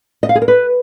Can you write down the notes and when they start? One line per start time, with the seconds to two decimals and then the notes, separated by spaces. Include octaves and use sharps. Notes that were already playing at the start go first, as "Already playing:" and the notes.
0.23 D#5
0.29 F5
0.35 G#4
0.42 A#4
0.48 B4